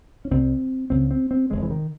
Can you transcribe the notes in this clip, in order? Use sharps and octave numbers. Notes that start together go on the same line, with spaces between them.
C#4
C2 C3 C4
C#2 C#3 C4
C4
C4
E1 E2 C3 G#3
E3
D#3